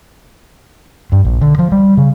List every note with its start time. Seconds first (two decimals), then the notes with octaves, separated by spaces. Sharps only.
1.12 G2
1.25 A#1
1.41 D3
1.59 F3
1.72 G3
1.97 C#3